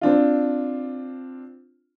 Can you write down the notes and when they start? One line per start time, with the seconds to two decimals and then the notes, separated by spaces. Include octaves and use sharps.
0.01 C4 D4 F4